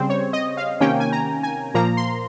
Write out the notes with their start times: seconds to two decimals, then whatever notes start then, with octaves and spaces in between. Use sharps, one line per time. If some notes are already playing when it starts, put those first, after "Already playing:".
Already playing: C#3 G3 C4 C5
0.10 C#5
0.33 D#5
0.57 F5
0.80 C3 D#3 A#3 C#4 G5
1.00 G#5
1.12 A#5
1.43 G#5
1.74 A#2 F3 A#3 A#5
1.97 C6